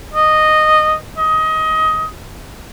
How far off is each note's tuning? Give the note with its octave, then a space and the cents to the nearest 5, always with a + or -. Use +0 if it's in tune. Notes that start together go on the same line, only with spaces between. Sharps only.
D#5 -10
D#5 +20